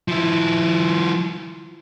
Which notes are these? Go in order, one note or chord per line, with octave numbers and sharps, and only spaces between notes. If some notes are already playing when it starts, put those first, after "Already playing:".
F3 E4